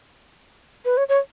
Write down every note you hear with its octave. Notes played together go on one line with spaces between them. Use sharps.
B4
C#5
C#5